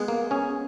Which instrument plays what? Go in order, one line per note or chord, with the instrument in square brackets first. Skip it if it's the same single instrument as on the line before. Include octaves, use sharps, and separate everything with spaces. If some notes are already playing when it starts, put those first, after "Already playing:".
Already playing: [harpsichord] G#3 B3
[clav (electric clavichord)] A#3
C#4 G#4